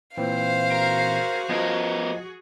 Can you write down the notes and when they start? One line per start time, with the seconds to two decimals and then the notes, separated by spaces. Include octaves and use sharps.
0.18 A#2 E3 C4 C5 F5
0.72 F#4 G#4 A#4
1.49 F3 B3 A#4 D#5 G#6